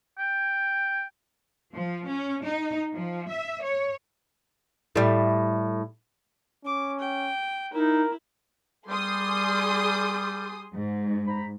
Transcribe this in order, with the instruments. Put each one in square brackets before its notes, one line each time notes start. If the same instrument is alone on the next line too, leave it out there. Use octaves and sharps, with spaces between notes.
[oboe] G5
[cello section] F3
C#4
D#4
F3
E5
C#5
[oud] A2 G3
[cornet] C#4 [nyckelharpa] D6
[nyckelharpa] G5
[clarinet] D#4 [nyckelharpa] E4 [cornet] A#4
[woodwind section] G3 [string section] G#4 C6 D#6
[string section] G#2
[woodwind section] C5 A#5 B5